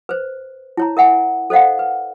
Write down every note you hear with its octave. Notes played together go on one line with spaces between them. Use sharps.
B4 C5
E4 C#5 A#5
A#4 E5 F#5 G#5
A4 C5 D#5 F5 F#5
B4